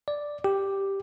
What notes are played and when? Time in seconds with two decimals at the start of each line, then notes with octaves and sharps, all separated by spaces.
0.08 D5
0.44 G4